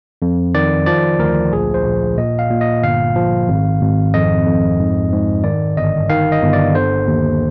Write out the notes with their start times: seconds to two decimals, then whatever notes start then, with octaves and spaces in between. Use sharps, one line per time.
0.22 F2
0.55 D#3 D5
0.86 F3 D5
1.19 D2 A#4
1.52 A#1 G#4
1.74 C5
1.85 A#1
2.17 A#2 D#5
2.39 F5
2.50 A#2
2.61 D#5
2.83 G1 F5
3.16 F3
3.48 G#1
3.81 G#1
4.14 F2 D#5
4.46 F2
4.80 G#2
5.12 G#2
5.44 D#3 D5
5.77 G1 D#5
6.10 D#3 F5
6.32 D#5
6.42 G1
6.53 D5
6.74 D3 C5
7.07 D#2